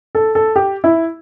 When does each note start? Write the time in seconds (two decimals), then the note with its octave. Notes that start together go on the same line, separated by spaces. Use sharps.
0.15 A4
0.35 A4
0.56 G4
0.84 E4